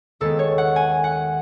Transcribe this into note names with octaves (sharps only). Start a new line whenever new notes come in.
D#2 D#3 G#3 B3 A4
C#5
F#5
G#5
F#5